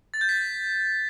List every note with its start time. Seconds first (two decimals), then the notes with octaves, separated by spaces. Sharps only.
0.14 A6
0.21 G6
0.29 B6